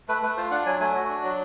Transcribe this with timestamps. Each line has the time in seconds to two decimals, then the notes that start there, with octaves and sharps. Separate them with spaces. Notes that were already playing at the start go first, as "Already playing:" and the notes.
0.09 A3 B4
0.22 A3 B4
0.37 F4 C5
0.51 D4 F#5
0.66 F#3 G#5
0.80 A3 G#5
0.95 F#4
1.09 D4
1.23 F#3